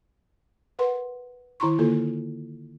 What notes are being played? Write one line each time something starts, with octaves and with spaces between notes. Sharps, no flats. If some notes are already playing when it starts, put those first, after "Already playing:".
A#4 B4 F#5 C6
D#3 E4 A#5 C6 C#6
D3 A#3 F4 A4 A#4